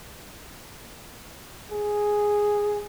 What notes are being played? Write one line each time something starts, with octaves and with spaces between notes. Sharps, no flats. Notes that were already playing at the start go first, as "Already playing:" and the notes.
G#4